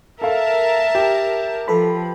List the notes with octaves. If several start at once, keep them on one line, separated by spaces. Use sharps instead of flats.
A4 A#4 E5 F5 A5
G4
F3 A4 B4 B5